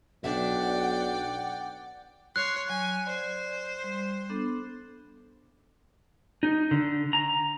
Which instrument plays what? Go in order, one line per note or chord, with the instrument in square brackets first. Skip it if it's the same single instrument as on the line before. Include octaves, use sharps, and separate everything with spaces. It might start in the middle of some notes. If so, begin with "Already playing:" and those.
[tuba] B1 [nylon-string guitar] D4 E5 [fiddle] D5 G5 [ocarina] F#5
[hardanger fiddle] C#5 C6 [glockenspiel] F#6
[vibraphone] F#3 [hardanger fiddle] G#5
[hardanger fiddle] C5 [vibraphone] D5
[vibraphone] G3
B3 D4 A4
[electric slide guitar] D#4
D3
A#5